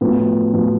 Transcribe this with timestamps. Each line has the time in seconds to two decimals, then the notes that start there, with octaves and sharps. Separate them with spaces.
0.01 A2 F3 B3 F#4
0.53 A2 F3 B3 F#4